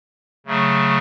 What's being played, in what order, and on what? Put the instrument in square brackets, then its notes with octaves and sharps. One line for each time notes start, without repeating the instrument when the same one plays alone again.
[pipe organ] C#3 F#3 A3